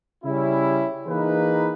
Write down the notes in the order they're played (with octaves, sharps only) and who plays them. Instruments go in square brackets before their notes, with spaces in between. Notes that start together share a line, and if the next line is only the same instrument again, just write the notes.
[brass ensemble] C#3 G3 C#4 E4
E3 A#3 D#4 G#4 B4